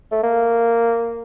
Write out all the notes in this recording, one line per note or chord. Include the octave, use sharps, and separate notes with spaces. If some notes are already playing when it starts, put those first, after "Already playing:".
A3
A#3